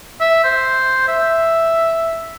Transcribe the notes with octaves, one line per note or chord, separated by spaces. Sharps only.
E5
C5
E5